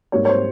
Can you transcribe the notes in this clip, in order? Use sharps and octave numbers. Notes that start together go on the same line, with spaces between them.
G#2 G3 A#3 C#5
C#5
C5